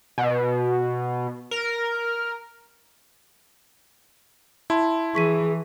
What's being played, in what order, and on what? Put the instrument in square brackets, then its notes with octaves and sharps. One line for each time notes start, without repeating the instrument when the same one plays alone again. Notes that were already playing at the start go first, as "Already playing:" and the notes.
[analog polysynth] B2
A#4
[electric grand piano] E4 [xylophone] A5 C6
[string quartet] E3 [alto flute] G#4 [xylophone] C#6 B6 D#7